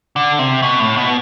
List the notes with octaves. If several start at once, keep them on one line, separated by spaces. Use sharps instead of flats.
D3
C3
B2
A2
B2